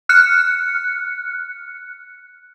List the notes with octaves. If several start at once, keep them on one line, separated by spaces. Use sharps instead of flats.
F6 F#6 C#7